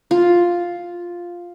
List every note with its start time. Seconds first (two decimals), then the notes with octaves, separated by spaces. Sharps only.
0.11 F4